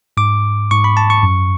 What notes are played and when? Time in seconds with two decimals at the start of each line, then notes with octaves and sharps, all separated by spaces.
0.17 G#2 D6
0.70 G#2 C#6
0.84 B5
0.97 A5
1.10 C#6
1.23 F#2